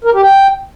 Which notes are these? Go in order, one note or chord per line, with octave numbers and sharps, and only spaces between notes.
A#4
G4
G5